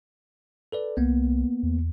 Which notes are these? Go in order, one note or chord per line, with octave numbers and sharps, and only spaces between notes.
A4 B4 D5
C2 A#3 B3
E2